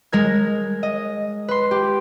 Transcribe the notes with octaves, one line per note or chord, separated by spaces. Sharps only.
G#3 A#4 G#6
D#5
B4 C6
G4